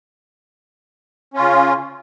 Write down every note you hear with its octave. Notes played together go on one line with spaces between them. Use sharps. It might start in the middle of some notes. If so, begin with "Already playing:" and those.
C#3 C#4 F4